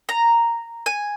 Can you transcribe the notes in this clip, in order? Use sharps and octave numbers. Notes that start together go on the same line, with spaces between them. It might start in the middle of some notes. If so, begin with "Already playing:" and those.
A#5
G#5